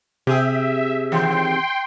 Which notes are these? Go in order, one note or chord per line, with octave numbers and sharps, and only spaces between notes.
C3 G4 G#4 E5
D#2 E3 G5 C6